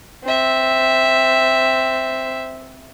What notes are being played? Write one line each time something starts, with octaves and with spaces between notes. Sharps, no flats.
C4 E5